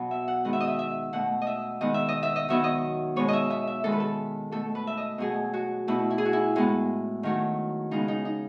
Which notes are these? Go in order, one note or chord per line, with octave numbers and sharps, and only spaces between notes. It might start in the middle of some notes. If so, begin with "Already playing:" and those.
Already playing: B2 F#3 B3
E5
F#5
D#3 G#3 B3 F#5
E5
D#5
E5
E5
B2 A3 F#5
D#5
E5
D#3 G#3 B3 D#5
E5
D#5
E5
D#5
D#3 F#3 B3 E5
D#5
B2 G#3 B3 C#5
D#5 E5
E5
E5
D#3 G#3 B3 A4
B4
A4
B2 A3 A4
B4
E5
D#5
B2 F#3 A3 G#4
F#4
B2 A3 E4
E4
G#4
F#4
E4
A2 G#3 B3
D#3 F#3 A3
C#3 G#3 B3 D#4
D#4
D#4